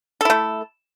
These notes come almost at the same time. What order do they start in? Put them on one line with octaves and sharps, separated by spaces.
A4 E4 A3